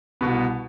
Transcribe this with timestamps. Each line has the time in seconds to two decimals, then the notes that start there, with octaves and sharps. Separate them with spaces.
0.21 C2 B2 B3